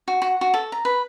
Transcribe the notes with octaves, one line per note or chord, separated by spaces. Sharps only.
F#4
F#4
F#4
A4
A#5
B4